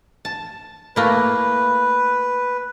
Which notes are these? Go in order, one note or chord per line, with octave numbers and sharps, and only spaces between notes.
A5
A3 A#3 E4 B4